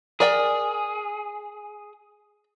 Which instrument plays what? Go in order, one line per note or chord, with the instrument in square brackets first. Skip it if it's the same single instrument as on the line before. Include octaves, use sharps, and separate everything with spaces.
[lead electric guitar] G#4 [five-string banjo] A#4 D5 G5